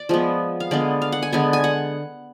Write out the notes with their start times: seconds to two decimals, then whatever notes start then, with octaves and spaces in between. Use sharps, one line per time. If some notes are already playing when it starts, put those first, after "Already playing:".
Already playing: D5
0.09 F3 G#3 B3
0.60 F5
0.71 D3 G#3 B3 D5
1.02 F5
1.12 F#5
1.22 G#5
1.33 D3 G#3 B3 G#5
1.53 G#5
1.64 F#5